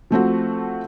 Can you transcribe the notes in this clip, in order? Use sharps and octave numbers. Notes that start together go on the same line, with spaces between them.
F3 A3 C4 F#4